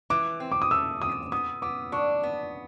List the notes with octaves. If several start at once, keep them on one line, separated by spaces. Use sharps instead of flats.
E3 D6
C4
D6
D#6
A3 E6
C4 D#6
B3 D#6
B3 D6
D4 C#6
B3